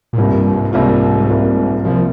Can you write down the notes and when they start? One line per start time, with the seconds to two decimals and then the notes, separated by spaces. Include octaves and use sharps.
0.13 A#2
0.18 C2 G#2 C3 G3 A#3 F4
0.31 G2
0.46 G2
0.59 G#2
0.73 C2 C3 G3 A#3 F4
1.29 C2 C3 G3 A#3 F4
1.84 C2 C3 F3 G3 A#3 F4